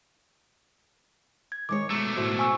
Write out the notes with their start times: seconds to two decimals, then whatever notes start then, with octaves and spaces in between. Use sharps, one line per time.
1.52 G#6
1.69 D#3 G#3 C#5 D6
1.90 B2 A3 A#5
2.17 A2 F#4 C5
2.39 G#5 C#6 E6